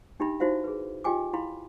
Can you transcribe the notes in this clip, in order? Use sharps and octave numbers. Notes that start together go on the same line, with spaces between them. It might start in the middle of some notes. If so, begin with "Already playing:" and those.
D4 D#4 G4 E5 G5 B5
D#4 E4 F#4 C5 E5 F5
G#4 B4
F4 G4 D#5 G5 G#5 D6
E4 F5 B5 C6